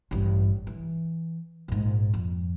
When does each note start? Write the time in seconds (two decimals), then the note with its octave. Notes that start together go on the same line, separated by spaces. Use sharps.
0.11 A1 G2
0.67 E3
1.68 A#1 G#2
2.14 F2